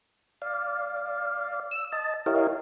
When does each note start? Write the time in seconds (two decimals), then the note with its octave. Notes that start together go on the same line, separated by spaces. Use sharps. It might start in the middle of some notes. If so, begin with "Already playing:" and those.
0.42 D5 F5
1.71 E6
1.92 D#5 A5
2.26 E4 G4 A#4 C#5 D#5 F5